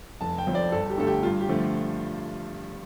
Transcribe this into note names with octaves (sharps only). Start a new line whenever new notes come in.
F1 A5
G5
F2 F3 C4
D5
G1 A4
G4
G2 D3 A3 A4
G4
G2 F4
G4
D3 F3 A3